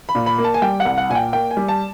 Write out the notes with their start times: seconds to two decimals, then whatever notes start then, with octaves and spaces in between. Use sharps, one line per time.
0.09 B5
0.15 A#2
0.26 B5
0.38 A#3
0.44 A5
0.54 G#5
0.62 G3 G5
0.80 F#5
0.85 C2
0.98 F#5
1.10 A#2 G#5
1.15 G5
1.33 A#3 G5
1.51 G#5
1.57 G3
1.68 A5